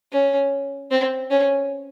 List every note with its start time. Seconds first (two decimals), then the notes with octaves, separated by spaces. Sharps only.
0.12 C#4
0.91 C4
1.31 C#4